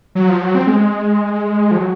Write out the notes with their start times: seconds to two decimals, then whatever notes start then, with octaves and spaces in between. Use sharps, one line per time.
0.15 F#3
0.29 F3
0.42 F#3
0.55 C4
0.67 G#3
1.71 F3
1.78 F#3